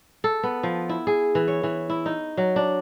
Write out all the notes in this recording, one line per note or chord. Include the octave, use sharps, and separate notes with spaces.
A4
B3
F3
E4
G#4
E3
C#5
E3
E4
D#4
F#3
D4